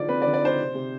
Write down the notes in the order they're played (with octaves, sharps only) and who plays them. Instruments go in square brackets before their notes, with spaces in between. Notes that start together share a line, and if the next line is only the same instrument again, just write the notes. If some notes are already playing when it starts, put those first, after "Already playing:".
Already playing: [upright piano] D3 F3 D#4 D5
C4 B4
D5
D3
D5
D#4 C5
C3
C3